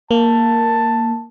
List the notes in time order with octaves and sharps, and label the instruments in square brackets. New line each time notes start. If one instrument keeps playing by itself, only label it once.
[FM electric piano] A#3 [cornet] A5